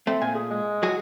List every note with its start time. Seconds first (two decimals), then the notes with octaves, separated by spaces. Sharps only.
0.07 A3 C4
0.22 A#2 G#5
0.35 G#4
0.50 G#3
0.83 F#3 F#4 G#4